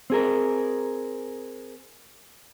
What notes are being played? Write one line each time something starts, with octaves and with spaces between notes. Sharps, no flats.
C4 G#4 A#4